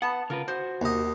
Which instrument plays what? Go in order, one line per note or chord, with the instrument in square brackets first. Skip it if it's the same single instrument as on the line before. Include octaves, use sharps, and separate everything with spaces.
[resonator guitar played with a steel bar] B3 A5 [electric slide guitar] F#5
[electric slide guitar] C#3 F4 B4 [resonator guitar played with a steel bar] A#4
[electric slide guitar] F#4 [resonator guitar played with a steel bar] C5
[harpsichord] D#2 D#5